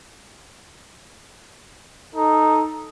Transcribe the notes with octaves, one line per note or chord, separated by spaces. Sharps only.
D#4 A4